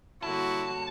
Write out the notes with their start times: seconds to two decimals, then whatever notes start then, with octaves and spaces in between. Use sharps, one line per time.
0.23 D3 G3 A#3 E4 F#4 C#5 A5